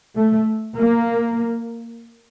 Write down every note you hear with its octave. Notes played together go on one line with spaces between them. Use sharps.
A3
A#3